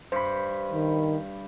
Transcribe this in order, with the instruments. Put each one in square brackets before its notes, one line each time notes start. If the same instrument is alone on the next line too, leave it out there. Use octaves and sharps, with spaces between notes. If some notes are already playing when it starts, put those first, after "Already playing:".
[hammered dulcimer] G2 B5 [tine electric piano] C5
[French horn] D#3